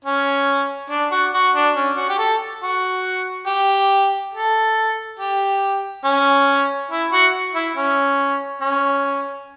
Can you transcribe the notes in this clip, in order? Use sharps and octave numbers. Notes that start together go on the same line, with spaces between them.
C#4
D4
F#4
F#4
D4
C#4
F#4
G4
A4
F#4
G4
A4
G4
C#4
E4
F#4
E4
C#4
C#4